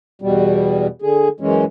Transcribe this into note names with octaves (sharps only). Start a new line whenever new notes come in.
E2 B2 G3
D3 G#4
F#2 E3 G#3 C#4